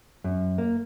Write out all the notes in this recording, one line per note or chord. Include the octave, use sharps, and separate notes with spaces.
F#2
A#3